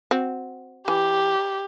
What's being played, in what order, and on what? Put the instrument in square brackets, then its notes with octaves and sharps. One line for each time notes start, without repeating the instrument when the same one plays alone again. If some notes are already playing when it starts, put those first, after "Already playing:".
[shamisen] C4 F#4
[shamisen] E3 [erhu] G4